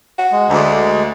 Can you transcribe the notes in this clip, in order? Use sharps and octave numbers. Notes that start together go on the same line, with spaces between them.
F#4
G#3
D2 D3